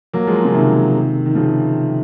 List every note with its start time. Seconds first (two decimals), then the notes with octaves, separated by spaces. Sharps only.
0.13 F#3 A#3
0.27 F3 G#3
0.45 C#3
0.54 C3 D#3
1.26 D#3
1.35 C#3 F3